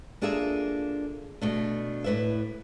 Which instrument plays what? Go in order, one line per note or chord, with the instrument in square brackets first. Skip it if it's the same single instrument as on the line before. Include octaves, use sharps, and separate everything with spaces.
[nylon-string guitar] A#3 D4 F4 G#4 A4 E5
B2 A3 D4
A2 B3 B4 D5 E5